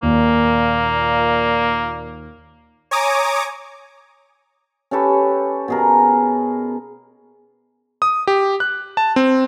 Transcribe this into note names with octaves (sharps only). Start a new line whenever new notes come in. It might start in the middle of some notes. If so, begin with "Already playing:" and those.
D#2 A#2 A#3
C#5 G#5 A#5 D6 D#6
C#4 G4 A4 B4
B2 G#4 A#4
D#6
G4
F#6
A5
C4